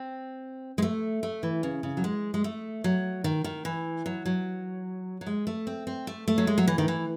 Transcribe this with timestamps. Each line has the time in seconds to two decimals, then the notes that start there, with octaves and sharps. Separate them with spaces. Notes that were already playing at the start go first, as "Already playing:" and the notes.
Already playing: C4
0.78 G#3
0.82 A3
1.23 A3
1.43 E3
1.63 C#3
1.83 C#3
1.97 F#3
2.04 G#3
2.34 G#3
2.44 A3
2.84 F#3
3.24 D#3
3.44 D#3
3.65 E3
4.06 F#3
4.26 F#3
5.21 F#3
5.27 G#3
5.47 A3
5.67 C4
5.87 C4
6.07 A3
6.28 A3
6.38 F#3
6.47 G#3
6.58 F#3
6.67 E3
6.78 D#3
6.88 E3